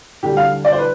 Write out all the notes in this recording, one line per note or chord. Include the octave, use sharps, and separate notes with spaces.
D2 D3 G3 G4
F5
D5
C5
B4